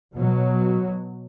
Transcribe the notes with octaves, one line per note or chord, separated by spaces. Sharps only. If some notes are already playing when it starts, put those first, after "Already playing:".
B2 F#3